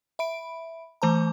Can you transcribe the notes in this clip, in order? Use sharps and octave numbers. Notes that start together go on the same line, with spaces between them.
E5 B5 D7
E3 A3 C5 A5 A#5